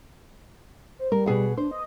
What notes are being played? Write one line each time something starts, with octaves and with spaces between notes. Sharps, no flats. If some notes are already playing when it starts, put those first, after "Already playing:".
C5
G3 A#4
B2 G#4 F#5
D4 C5
D#5